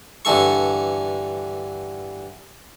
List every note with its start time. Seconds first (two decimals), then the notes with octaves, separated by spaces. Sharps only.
0.25 G2 D3 E3 A4 C#6